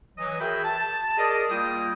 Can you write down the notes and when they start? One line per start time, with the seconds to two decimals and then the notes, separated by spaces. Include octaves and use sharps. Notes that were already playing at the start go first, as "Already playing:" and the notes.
0.18 E3 F#3 D#5
0.40 F#4 G#4 A#4 E5 G5 B5
0.64 A5
1.18 G#4 A#4 D5 D#5
1.50 G3 A#3 F4 D5 G5 D#6